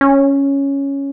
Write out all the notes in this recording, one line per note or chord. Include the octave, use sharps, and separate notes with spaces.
C#4